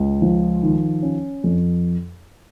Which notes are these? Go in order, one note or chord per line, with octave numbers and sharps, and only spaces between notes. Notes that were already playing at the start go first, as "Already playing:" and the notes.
Already playing: C#2
F3
D#3
C#4
F2